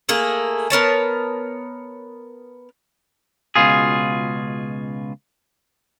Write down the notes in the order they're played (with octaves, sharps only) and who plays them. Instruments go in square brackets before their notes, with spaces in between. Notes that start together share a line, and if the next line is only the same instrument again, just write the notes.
[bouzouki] A3 A#3 G#4
B3 A#4 C#5 A5
[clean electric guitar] C#2 B2 F4 G#4